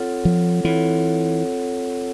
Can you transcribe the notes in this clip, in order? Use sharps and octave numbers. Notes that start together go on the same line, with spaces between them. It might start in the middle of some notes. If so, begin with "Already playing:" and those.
Already playing: C4 F4 A4 C#5 F#5
F3
E3 C4 F4 A4 C#5 F#5